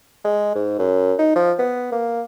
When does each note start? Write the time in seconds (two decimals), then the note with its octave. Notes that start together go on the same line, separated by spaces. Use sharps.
0.25 G#3
0.55 G#2
0.79 F#2
1.19 D#4
1.36 F3
1.59 B3
1.92 A#3